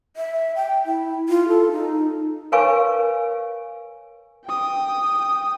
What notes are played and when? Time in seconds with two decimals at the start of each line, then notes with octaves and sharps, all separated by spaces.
0.17 E5
0.56 G5
0.86 E4
1.29 F4
1.48 A4
1.72 D#4
2.52 A#4 B4 C#5 F5 G#5 C#6
4.45 G5 D#6